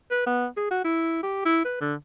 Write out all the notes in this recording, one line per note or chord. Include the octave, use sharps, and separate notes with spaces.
B4
B3
G#4
F#4
E4
G4
E4
B4
D3